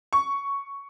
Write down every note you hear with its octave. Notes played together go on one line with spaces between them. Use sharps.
C#6